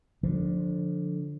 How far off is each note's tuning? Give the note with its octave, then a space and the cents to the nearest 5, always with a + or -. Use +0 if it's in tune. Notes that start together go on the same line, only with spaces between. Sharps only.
D3 +0 F3 +20